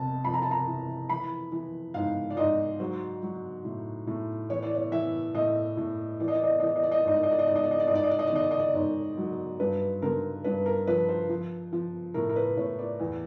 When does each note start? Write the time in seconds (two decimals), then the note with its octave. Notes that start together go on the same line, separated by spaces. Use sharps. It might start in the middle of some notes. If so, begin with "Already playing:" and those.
Already playing: F2 C3 A5
0.24 F2 B5
0.34 A#5
0.42 A5
0.51 A#5
0.67 E3
1.09 E3 B5
1.52 E3
1.94 G#2 F5
2.30 D5
2.37 G#2 D#5
2.80 F#3 C5
3.22 F#3
3.65 A2
4.07 A2
4.49 E3 C#5
4.62 D5
4.75 C#5
4.92 E3 E5
5.35 A2 D#5
5.77 A2
6.20 E3 D5
6.28 D#5
6.35 D5
6.44 D#5
6.51 D5
6.60 E3 D#5
6.68 D5
6.76 D#5
6.83 D5
6.91 D#5
7.00 D5
7.05 G#2 D#5
7.15 D5
7.23 D#5
7.31 D5
7.39 D#5
7.47 G#2 D5
7.56 D#5
7.64 D5
7.71 D#5
7.80 D5
7.88 G#2 D#5
7.95 D5
8.04 D#5
8.11 D5
8.19 D#5
8.27 D5
8.33 D#3 D#5
8.43 D5
8.51 D#5
8.59 D5
8.74 G#2 C#5
9.17 F#3
9.60 G2 B4
10.02 D3 A#4
10.44 G2 B4
10.66 A#4
10.87 F3 B4
11.09 C5
11.29 F3
11.73 F3
12.14 A2 A#4
12.29 A#4
12.36 B4
12.57 A2 C#5
12.79 D5
13.00 E2